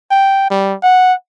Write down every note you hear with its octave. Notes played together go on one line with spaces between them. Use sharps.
G5
G3
F#5